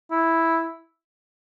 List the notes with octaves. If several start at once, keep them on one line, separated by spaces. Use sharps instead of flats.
E4